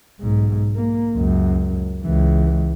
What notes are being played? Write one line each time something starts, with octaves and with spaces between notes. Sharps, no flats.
B1 G#2
A#3
C#2 F#2
C#2 E3